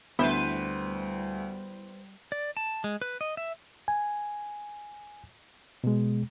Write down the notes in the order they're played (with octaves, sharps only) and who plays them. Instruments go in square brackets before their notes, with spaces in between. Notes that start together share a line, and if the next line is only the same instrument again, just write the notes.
[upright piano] D2 [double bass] G3 [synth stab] B3 E4 [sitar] B4 C5
[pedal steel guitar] D5
A5
G#3
B4
D#5
E5
[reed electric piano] G#5
B2 G#3